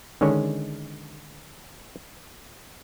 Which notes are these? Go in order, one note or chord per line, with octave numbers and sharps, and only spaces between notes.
D3 D#3 G#3 C#4 C#5